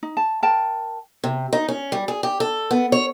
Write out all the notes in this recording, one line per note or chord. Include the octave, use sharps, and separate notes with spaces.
D#4
A5
A#4 G5 A5
C3
D#4
C#4
G3
G#4
G4
A4
B3
C#5